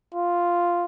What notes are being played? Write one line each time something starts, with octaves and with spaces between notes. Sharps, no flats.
F4